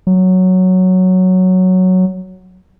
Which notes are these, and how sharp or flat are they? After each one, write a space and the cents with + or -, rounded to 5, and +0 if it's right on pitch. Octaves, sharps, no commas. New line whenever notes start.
F#3 +0